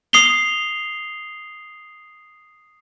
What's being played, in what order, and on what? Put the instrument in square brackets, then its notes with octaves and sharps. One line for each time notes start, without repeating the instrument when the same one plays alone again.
[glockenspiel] D#6 C7 F7 G7